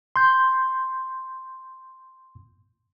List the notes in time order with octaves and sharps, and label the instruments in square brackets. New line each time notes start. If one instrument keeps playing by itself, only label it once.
[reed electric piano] C6 G6